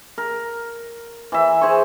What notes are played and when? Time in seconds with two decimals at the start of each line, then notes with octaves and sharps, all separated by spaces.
0.18 A#4
1.32 E3 E5
1.61 G#4 C5 G#5 C#6